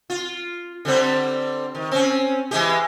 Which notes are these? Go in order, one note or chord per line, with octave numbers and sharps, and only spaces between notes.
F4
D3 G3 C4
D#3
C4 C#4
E3 G#3 G4